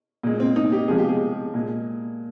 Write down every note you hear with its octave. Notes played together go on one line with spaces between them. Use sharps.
A#2 G#3
C4
D#4
G4
C3 F3 G#3 G#4
G4
G#4
A#2 G#3